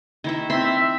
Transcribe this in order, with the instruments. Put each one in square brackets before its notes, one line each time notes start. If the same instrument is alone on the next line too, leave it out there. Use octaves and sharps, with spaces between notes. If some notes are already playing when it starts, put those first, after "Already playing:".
[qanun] D#3 E4 E5
[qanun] C4 B5 C6 [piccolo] E5
[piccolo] E5